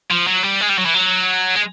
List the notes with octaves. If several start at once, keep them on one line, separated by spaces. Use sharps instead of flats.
F3
F#3
G3
G#3
G3
F#3
E3
F#3
G#3